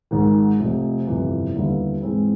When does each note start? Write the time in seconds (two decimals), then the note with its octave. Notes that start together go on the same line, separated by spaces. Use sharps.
0.11 G#1 G#2 D#3
0.59 F1 F2 C3
1.07 G1 F2 C3 E3
1.55 D#2 D3 G3 B3 E4
2.02 G#2 E3 G#3 C4